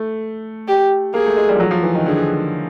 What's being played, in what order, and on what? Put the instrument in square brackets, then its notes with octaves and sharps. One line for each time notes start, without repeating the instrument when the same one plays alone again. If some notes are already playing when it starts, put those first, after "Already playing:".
Already playing: [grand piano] A3
[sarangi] G4
[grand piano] A#3 [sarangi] G#4
[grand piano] A3
G#3
G3
F3
F#3
F3
E3
D#3
[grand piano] D3 [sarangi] G#4